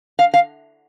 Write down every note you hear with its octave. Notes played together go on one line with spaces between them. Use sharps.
F5
F5